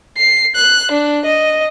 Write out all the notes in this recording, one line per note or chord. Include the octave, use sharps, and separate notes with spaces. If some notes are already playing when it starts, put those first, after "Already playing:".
C7
F#6
D4
D#5